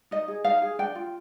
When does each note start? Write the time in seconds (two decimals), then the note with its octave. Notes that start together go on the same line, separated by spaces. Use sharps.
0.11 D#4 D#5
0.28 G#4
0.44 D#4 F5
0.62 G#4
0.79 D4 G5
0.95 F4